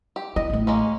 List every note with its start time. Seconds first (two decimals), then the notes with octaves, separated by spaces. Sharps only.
0.16 G4
0.36 E4 D#5
0.50 A1 A3
0.67 G#3 A#3 C#4